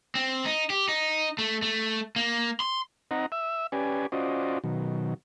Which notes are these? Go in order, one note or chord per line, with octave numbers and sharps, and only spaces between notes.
C4
D#4
G4
D#4
A3
A3
A#3
C6
C4 D#4 D#5 F#5 A#5
E5 E6
C#4 G4 B4 D5 G#5
C#4 F4 F#4 C5 D5 D#5
B2 D#3 F#3